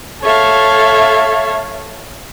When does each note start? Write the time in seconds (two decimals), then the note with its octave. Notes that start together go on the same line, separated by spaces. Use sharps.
0.21 A4 C#5 E5 F5